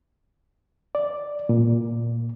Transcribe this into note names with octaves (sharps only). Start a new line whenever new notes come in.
D5
A#2